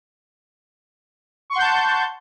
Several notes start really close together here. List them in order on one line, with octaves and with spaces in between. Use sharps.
C#6 C6 F#5 G6 A5